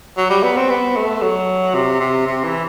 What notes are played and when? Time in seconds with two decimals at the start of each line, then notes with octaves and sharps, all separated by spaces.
0.18 F#3
0.30 G3
0.43 B3
0.57 C4
0.70 B3
0.96 A3
1.22 F#3
1.75 C3
2.00 C3
2.26 C3
2.44 E3